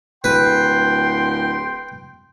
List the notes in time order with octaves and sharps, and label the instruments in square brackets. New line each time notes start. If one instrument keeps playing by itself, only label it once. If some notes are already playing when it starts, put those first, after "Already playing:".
[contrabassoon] D1 [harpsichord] B4 [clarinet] G5 [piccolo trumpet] C6